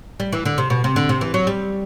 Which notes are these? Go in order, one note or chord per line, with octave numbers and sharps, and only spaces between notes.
G3
E3
D3
C3
B2
C3
D3
C3
E3
F#3
G3